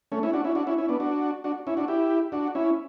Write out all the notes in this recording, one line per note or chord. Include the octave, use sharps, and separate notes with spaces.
A3 C#4
C#4 E4
D4 F#4
C#4 E4
D4 F#4
C#4 E4
C#4 E4
B3 D4
D4 F#4
D4 F#4
C#4 E4
D4 F#4
E4 G4
D4 F#4
C#4 E4